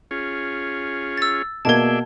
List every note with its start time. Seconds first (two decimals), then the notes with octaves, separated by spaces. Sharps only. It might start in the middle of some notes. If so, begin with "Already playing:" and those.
0.11 C#4 F4 G#4
1.18 E6 A6
1.65 B2 A#3 G#4 D5 E5 A5 G#6 G7